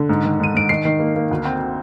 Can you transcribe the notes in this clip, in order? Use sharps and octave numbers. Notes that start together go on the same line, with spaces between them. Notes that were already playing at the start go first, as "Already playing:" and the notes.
Already playing: D3
G#2
D#3
G#2 D#7
G#2 D7
D#3 C7
D#3
A#3
A#3
D2
C4